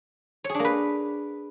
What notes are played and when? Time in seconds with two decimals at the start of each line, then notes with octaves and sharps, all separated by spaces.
0.44 C#5
0.49 G#4
0.54 D4
0.59 A#3
0.65 B4